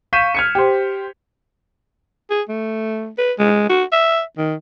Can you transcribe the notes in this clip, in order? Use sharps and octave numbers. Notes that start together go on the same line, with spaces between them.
F5 C#6 G6 B6 D#7 E7
F6 G#6 C#7
G4 C5
G#4
A3
B4
G#3
F#4
E5
D#3